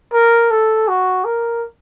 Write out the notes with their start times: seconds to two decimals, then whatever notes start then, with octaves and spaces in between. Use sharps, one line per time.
0.13 A#4
0.51 A4
0.88 F#4
1.25 A#4